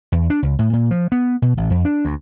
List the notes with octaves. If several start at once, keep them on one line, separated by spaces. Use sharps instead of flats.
E2
D4
C#2
A2
A#2
F3
B3
B2
A1
F2
D4
D2